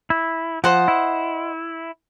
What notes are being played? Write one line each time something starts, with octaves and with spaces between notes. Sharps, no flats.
E4
F3 C5 D#5 F#5
E4